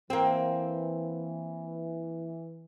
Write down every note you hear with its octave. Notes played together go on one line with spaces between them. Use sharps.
E3 A#3 C4